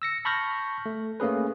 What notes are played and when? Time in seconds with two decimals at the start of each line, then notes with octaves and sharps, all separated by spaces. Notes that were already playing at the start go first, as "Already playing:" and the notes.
0.02 E6 A#6 C#7
0.25 A5 B5 C#6 F6 G6 A#6
0.86 A3
1.20 A3 A#3 C#4 G#4 B4